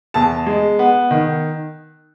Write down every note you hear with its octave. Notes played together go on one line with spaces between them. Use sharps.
E2 A5
G#3
B3
D#3